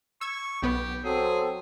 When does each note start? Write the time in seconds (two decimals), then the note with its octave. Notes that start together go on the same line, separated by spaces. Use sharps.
0.21 C#6 E6 G#6
0.63 B1 B3 G4 B4
1.05 F#3 C4 G#4 A4